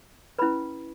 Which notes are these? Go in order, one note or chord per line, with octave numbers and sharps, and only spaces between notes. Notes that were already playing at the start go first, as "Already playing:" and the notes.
C#4 E4 B4 B5